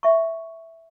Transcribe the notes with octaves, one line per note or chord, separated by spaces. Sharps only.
E5 C#6